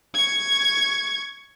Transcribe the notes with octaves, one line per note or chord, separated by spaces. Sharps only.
C#6 G#6